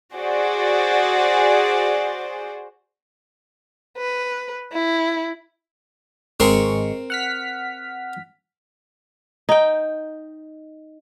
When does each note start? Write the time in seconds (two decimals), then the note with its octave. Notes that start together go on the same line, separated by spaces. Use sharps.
0.14 F#4 G#4 C5 D5
3.98 B4
4.72 E4
6.40 G#1 G#3 C4 A#4 C6 C#6
7.10 F#5 F6 B6
9.49 D#4 G5